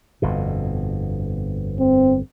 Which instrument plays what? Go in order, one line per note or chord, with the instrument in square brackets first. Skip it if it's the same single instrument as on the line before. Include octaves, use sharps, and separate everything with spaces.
[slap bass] G1 F2 B2
[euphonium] C4